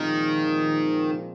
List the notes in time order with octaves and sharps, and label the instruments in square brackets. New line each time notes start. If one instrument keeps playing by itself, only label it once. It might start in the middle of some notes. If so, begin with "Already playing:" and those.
Already playing: [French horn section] A#2 F3 G#3 C4 [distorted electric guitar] D#3